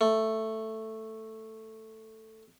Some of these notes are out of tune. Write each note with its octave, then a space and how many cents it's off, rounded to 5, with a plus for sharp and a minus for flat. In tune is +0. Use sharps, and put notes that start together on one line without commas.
A3 +5